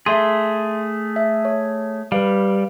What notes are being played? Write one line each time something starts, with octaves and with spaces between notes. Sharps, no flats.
A3 G#4 E5 C6
E5
C#5
G3 B4 F5